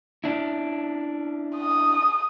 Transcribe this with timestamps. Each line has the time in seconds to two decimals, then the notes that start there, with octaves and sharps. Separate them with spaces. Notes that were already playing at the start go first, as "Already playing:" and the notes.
0.24 C#4 D4 E4
1.57 D#6